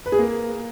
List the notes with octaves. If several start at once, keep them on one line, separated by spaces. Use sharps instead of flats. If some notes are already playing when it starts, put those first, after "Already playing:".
B4
G#4
A#3